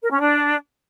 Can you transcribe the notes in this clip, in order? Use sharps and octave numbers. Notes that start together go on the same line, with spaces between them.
A#4
C#4
D4